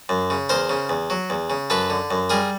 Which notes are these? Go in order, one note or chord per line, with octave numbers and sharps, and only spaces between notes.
F#2
C#3
E2 A#4 C5
C#3
E2
F#3
E2
C#3
F#2 A4 B4
D3
F#2
G3 G#4 A#4